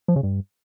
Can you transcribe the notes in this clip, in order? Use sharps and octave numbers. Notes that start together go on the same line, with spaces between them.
F3
C#3
G2